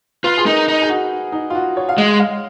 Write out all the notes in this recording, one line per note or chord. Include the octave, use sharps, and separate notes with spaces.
F4 B4
G#4
D#4 A#4
D#4
G#4
F#4
D#4
F4
F#4
C#5
F5
G#3 D#5
F5